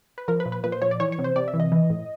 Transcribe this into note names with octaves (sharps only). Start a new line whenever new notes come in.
B4
F3 A#4
B4
A#2
B4
A#2 B4
C5
F3 C#5
D5
E3 C#5
C#5
C3
C5
C3 D5
E5
E3
D#5
E3
A2